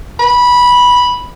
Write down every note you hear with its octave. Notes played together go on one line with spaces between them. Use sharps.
B5